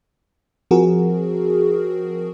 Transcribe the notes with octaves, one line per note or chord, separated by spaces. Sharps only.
F3 C4 F#4 G#4 A#4